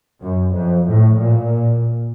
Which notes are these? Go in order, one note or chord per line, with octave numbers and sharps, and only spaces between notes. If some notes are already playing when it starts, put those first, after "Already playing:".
F#2
F2
A2
A#2